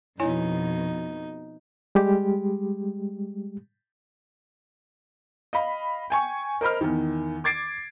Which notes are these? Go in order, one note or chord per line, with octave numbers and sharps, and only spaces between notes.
F2 B2 D#4 E4 C#5 G#5
G3 G#3 G4
D#5 F5 B5
G5 G#5 C#6
A#4 C5 D#5 B5 F6
E2 D#3
D6 G#6 A6 C7 D7